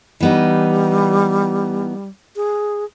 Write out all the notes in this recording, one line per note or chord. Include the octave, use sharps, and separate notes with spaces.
E3 G3 B3 D#4
G#4